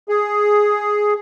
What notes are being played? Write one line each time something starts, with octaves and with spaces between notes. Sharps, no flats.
G#4